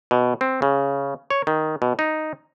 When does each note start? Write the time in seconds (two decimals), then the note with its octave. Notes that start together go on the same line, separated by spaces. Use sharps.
0.11 B2
0.41 C4
0.62 C#3
1.30 C#5
1.47 D#3
1.82 B2
1.99 D#4